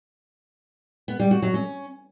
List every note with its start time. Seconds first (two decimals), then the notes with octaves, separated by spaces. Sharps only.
1.08 B3
1.20 G3
1.31 F#4
1.42 F#3
1.54 C#4